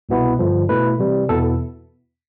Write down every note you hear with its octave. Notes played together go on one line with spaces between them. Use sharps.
C2 B2 B3 E4
G2 D3 F3
B2 A3 E4 B4
C3 E3 G3
E2 B2 B3 E4 A4